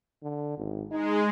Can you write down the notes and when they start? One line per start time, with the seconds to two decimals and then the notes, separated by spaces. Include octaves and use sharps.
0.23 D3
0.58 G#1
0.91 G#3 D#4